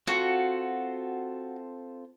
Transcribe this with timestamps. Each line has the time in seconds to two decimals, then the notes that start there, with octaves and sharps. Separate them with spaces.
0.07 C4 F4 F#4 A4